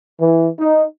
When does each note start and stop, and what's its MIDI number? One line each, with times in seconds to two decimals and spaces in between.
0.20 0.49 52
0.60 0.83 63